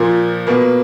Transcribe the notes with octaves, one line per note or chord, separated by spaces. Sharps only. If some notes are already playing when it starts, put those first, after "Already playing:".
Already playing: A#2 F3
B2 A#3